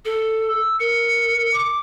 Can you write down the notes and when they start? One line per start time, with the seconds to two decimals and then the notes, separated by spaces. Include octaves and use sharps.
0.05 A4
0.48 E6
0.80 A#4 C#7
1.53 D6